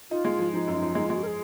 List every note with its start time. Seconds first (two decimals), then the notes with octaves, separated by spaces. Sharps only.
0.10 D#4 F4
0.25 G#3
0.39 F3
0.53 F3 D#4
0.67 F#2
0.74 D#4
0.82 F3
0.95 G#3 D#4
1.06 G#3 F4
1.16 F#4
1.23 A#4
1.27 G#4